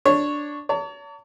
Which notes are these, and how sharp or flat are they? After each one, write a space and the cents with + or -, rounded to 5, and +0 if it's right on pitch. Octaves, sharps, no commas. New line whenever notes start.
D4 +0 C#5 +0
C#5 +45 A5 +45